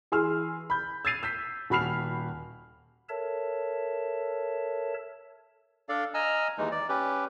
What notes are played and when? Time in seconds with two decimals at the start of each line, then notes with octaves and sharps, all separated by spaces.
0.12 E3 G#4 C6 E6 F6
0.70 B5 G6
1.05 E6 G#6 A6 C7 D#7 F7
1.23 E6 G6 B6
1.70 D#1 F#4 B5 F6 C7 F7
3.09 A4 A#4 C#5 E5 A5
5.89 D4 A4 D5 F5
6.14 D#5 G#5 A#5 E6 F6
6.58 D#2 E3 G#3 D#4
6.71 D5
6.89 C#4 G4 B4